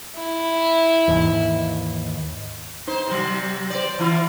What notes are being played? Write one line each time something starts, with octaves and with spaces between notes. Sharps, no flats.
E4
D#2 G#2 E3
D#4 C5
C3 F#3
C5 D5
E3 E4 F4